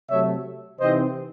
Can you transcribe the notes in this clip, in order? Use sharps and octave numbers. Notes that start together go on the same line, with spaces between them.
C3 F#3 A3 C#5 E5
C3 E3 C4 D#4 C5 D#5